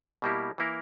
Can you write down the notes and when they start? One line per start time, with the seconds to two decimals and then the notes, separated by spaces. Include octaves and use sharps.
0.22 B2 G3 A#3 E4 G4
0.58 E3 A#3 E4 A#4